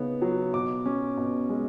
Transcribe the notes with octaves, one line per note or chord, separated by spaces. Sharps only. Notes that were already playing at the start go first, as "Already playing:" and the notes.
Already playing: C#3 B3 D#4
F#3
B2 D6
C#4
B2
G#3